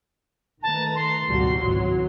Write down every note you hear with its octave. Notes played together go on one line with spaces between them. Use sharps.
D#3 A3 B4 A5 A#5
C6
G#1 C#2 B2 F3 G3 F#4
G#1 C#2 E3 F#3